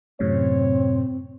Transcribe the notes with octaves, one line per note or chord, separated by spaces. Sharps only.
F#2 A2 C3 C4 C#5